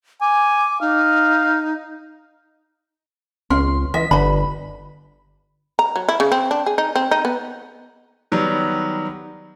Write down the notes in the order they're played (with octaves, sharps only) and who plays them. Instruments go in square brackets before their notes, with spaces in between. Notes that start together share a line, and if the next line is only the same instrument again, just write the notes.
[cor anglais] G#5 [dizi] D6
[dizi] D#4 [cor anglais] F5
[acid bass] C#2 [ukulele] C#4 [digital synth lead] C6
[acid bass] E3 [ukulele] D#5 [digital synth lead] B6
[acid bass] G1 [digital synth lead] D3 [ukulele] B4 B5
[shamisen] A#5
F#3
E4
C#3
C4
D4
G#4
D#4
C4
D#4
B3
[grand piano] D#3 F#3 G3 B3